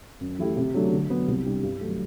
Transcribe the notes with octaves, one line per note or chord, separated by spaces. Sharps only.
F#2
E3 A3 E4 G4
C3
F#3 A3 D4
D3
F#3 B3
C2
C3 G3 D4 G4
G2
F#3 A3